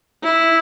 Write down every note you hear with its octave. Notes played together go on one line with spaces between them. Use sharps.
E4